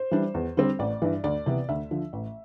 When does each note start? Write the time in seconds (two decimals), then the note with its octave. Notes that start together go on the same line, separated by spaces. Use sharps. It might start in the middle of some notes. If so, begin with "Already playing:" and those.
Already playing: C5
0.11 E3 G3 D4
0.34 E2
0.57 D3 G3 C4
0.79 A1 D5
1.02 G2 E3
1.24 D2 D5
1.46 C3 E3 B3
1.69 D2 E5
1.91 D3 F3
2.13 A1